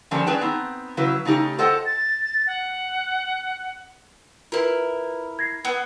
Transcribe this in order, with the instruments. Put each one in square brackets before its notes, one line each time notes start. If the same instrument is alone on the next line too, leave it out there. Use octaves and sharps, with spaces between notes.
[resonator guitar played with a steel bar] D3 F3 G3 A#3 C#4 D4
C#4 G#4 B4 D5 G5 A5
B3 C4 D#4
C#3 F#3 E4 B4
C#3 A3 D#4 G4
F4 A4 C5 D#5 F#5 G5
[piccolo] A6
F#5
[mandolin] E4 A#4 [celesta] F4 B4
[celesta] G#6 A#6 C7
[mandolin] B3